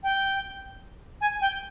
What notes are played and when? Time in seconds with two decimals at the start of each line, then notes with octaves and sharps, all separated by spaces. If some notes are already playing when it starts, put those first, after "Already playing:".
0.03 G5
1.21 G#5
1.41 G5